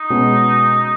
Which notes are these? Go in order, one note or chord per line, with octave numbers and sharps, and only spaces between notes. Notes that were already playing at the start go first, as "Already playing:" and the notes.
Already playing: D#4
B2 G#3 C#4